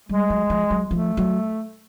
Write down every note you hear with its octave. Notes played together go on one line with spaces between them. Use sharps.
G3 G#3
F#3
F3
F#3
F3 A3
F#3